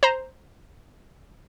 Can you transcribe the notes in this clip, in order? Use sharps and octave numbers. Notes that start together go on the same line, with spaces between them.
C5 A#5